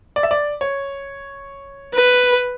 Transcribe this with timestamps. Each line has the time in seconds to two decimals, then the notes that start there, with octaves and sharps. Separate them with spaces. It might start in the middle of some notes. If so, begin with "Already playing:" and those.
0.16 D5
0.23 E5
0.31 D5
0.61 C#5
1.94 B4